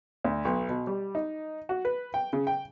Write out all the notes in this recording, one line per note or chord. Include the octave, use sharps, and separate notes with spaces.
D2
B1
B2
G3
D#4
F#4
B4
G5
C#3
G5